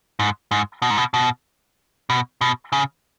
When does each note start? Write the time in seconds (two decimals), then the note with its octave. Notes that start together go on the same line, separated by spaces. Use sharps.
0.19 G#2
0.51 G#2
0.82 B2
0.90 G#2
0.98 B2
1.14 B2
2.10 B2
2.41 B2
2.72 C#3